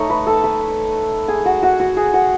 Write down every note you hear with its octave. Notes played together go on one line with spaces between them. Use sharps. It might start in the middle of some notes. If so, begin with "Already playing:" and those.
Already playing: A3 D#4 C#5 C#6
B4 B5
A4 A5
B4 B5
G#4 G#5
F#4 F#5
F#4 F#5
F#4 F#5
G#4 G#5
F#4 F#5